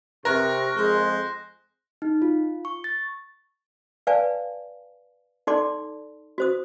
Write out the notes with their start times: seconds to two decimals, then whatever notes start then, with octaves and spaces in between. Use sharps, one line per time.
0.25 C3 A#4 C#6 F#6 A#6
0.76 F2 G#3 C5
2.02 D#4
2.22 F4
2.65 C#6
2.84 A6
4.07 B4 D5 F5 G#5 A5
5.47 D#4 A4 D5 A5 C6 D6
6.38 F#4 C5 D#6